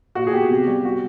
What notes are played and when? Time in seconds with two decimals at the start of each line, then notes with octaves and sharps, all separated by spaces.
0.15 A#2 F#4
0.27 G#4
0.33 B3 G4
0.51 C3
0.68 G3
0.85 F#4